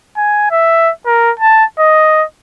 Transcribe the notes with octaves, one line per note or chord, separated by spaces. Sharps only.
G#5
E5
A#4
A5
D#5